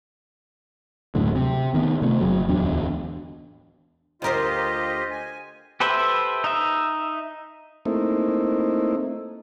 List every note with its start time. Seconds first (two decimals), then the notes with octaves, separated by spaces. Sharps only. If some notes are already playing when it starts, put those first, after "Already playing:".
1.15 D1 F#2 A2 D3
1.36 C3
1.74 D#3 B3
2.02 C3 A3
2.21 F#1 F#3
2.48 D1 E2 D4
4.22 D2 F4 G4 A#4 C5 D#5
5.11 G#5
5.80 G4 A4 B4 C5 E5
6.44 D#4 E5
7.85 A3 A#3 C4 D#4 E4